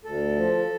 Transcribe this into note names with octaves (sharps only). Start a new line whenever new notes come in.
D2 A4
F3